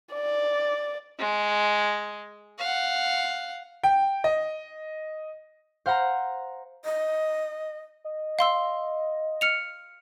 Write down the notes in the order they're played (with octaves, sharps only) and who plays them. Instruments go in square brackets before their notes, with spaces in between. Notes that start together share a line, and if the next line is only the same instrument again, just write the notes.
[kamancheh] D5
[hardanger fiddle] G#3
F5 F#5
[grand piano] G5
D#5
[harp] C5 F5 F#5 A#5
[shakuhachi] D#5
[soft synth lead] D#5
[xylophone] F5 C6 E6
F6 C#7 F7